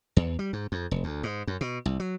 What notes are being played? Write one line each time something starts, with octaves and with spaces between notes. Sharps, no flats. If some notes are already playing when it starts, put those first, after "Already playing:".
E2
G3
G#2
F2
F1
D2
G#2
F#2
B2
C2
F#3